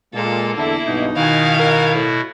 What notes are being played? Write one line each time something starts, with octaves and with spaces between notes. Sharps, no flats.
A#2 G#3 A#3 A4
E2 D3 E4 A4
B1 G2 B2 D#4
B2 D#3 E4 F#4 F5 G#5
A#4
A2